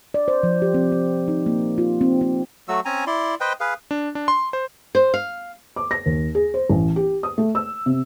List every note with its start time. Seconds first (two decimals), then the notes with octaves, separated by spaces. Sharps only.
0.14 D5
0.28 C5
0.43 F3
0.62 G4
0.74 C4
0.92 C4
1.28 D#4
1.46 A#3
1.78 F4
2.01 C4
2.21 C4
2.68 F#3 A3 F#4 E6
2.85 C4 C#4 G#5 A#5
3.07 E4 D5 C6
3.40 B4 C5 D#5 G5
3.60 G#4 B4 F5
3.91 D4
4.15 D4
4.28 C6
4.53 C5
4.95 C5
5.14 F5
5.76 D6
5.91 A#6
6.06 D#2
6.35 G#4
6.54 C5
6.70 A1
6.96 G4
7.23 D#6
7.38 A3
7.55 E6
7.86 C3